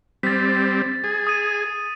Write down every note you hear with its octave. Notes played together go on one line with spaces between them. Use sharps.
G3 C4 A6 B6
G#4
D#6 D#7